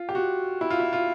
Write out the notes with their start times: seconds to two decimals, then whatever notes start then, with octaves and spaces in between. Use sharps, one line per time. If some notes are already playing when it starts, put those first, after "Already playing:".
Already playing: F4
0.09 G4
0.15 F#4
0.61 E4
0.70 F4
0.80 E4
0.93 F4